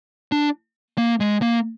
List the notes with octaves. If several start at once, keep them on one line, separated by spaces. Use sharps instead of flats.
D4
A#3
G#3
A#3